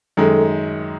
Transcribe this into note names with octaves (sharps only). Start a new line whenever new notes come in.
F#2 D#3 G#3 A4